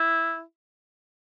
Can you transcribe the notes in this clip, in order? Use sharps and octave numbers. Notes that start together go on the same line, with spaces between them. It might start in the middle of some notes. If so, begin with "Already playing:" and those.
Already playing: E4